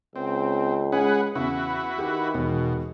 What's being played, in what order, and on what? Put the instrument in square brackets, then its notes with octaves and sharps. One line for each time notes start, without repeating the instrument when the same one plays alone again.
[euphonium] C#2 [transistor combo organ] C4
[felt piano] G#3 C#4 [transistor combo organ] G#4 B4 F#5
[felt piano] E2 C#3 [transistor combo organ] E4 F#4 B4
[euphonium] D#3 [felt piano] G4
[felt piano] E1 [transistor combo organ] B2